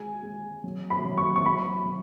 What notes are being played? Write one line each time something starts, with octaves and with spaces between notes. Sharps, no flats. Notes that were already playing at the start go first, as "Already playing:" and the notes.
Already playing: G#3 G#5
G#3
F#3
B5
F#3
C#6
C#6
F#3 B5
F#3